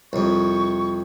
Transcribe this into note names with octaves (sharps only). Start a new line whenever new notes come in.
C2 F2 C#6